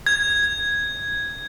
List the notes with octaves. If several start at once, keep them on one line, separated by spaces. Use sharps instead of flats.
G#6